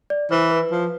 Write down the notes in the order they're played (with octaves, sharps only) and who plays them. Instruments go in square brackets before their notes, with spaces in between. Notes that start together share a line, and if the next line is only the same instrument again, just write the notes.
[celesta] D5
[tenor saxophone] E3 [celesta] C5
[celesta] B4
[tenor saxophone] F3